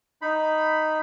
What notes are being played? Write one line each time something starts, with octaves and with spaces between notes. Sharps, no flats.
D#4 B5